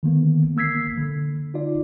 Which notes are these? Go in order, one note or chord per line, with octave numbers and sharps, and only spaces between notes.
D3 D#3 A#3 B3
A#3 E6 G#6 B6 C7
D3
D#4 F4 D5